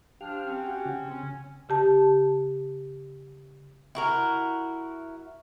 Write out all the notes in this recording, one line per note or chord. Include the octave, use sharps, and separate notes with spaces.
F3 D4 G4 F5
C4 C#4
F#4 G4
C#3
C#4
C#3 G4 A5
E4 F#4 A#4